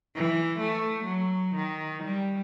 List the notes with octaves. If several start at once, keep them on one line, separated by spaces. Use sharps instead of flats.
E3
A3
F#3
D#3
G3